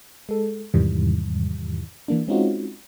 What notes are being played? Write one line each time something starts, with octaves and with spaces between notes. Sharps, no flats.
G#3 A4
E2 G#2 C3 D#3 E3 G3
E3 A#3 D4
G#3 C4 C#4 D#4 F4 F#4